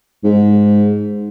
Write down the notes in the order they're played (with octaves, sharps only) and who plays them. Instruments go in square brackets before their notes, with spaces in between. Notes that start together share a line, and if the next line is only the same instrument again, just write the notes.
[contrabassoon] G#2